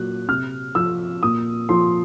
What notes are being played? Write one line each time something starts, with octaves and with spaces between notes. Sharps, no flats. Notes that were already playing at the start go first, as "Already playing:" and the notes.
Already playing: A#2 F#3 F#6
C3 F6
F3 E6
A#2 D#6
F3 C6